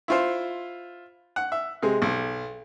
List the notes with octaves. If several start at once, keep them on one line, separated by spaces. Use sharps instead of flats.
E4 F4 C5
F#5
E5
C3 G#3
B1